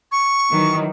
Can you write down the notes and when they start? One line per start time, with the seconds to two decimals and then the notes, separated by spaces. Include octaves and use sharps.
0.12 C#6
0.50 D#3 E3 F#3